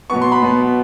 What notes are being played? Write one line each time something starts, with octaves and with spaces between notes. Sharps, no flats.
B2 F#3 B3 C#6
C6
B5
B2 F#3 B3